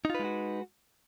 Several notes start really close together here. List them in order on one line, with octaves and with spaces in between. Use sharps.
D#4 F4 B4 G#3 F#4